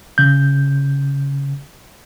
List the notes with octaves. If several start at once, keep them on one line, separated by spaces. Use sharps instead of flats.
C#3 G6